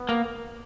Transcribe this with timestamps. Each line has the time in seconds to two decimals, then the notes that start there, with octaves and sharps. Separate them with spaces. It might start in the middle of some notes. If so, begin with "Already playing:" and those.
Already playing: B3
0.09 A#3